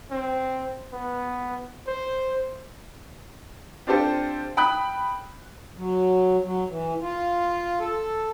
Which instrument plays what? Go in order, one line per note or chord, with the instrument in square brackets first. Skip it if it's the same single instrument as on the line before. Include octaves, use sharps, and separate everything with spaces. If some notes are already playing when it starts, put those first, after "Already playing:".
[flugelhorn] C4
B3
C5
[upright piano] C4 D4 F4 G4 A4 C5
G5 B5 D#6 F#6
[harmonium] F#3
F#3
E3
F4
A4